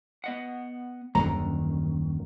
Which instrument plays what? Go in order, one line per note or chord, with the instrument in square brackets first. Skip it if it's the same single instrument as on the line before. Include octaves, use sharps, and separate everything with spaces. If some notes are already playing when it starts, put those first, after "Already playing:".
[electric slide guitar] B3 D#5 F#5
[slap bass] D#1 F#2 D3 [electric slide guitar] D#3 [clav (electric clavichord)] A#5